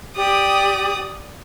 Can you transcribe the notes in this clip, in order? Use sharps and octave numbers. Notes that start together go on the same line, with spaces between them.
G4 D5 D#6